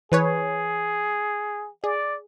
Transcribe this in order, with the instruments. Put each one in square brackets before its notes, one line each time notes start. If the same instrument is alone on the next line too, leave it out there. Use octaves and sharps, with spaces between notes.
[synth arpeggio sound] E3 B4 C#5 [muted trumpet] G#4
[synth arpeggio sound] G#4 [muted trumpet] D5